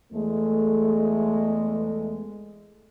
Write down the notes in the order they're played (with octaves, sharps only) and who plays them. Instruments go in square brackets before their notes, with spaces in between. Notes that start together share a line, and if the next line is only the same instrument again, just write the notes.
[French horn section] E2 G#3 A3